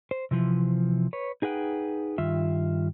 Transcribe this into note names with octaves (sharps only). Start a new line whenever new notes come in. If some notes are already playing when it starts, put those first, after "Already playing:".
C5
C3 E3 F3
B4 C#5
D#4 G#4 B4 F#5 G5
G2 D#3 F4 E5